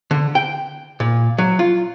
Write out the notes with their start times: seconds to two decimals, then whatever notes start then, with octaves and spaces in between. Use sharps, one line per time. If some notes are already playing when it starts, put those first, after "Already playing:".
0.11 D3
0.35 G5
1.00 A#2
1.38 F#3
1.59 F4